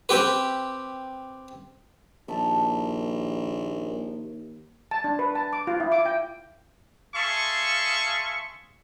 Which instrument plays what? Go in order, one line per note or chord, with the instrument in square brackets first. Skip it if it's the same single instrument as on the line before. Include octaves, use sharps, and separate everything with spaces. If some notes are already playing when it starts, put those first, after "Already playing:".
[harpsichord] C4 G4 B4
[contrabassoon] A#1 [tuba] D#2 [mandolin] E5 A5 A#5
[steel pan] A5
D4
B4
A5
D6
F4
E4
D6
G5
[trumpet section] G#4 E5 F5 A5 C6 C#6